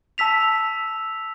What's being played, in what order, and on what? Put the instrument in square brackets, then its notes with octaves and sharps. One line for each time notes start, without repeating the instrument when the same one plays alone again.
[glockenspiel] A5 E6 B6 F7